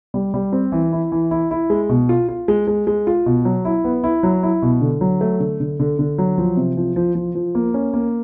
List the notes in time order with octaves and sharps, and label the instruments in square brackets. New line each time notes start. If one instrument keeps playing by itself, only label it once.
[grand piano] G3
G3
C4
E3
E4
E3
E4
E4
G#3
B2
F4
F4
G#3
G#3
G#3
F4
B2
F#3
E4
B3
E4
F#3
E4
B2
D3
F#3
A3
D3
D3
D3
D3
F#3
F3
C3
F3
F3
F3
F3
A#3
C#4
A#3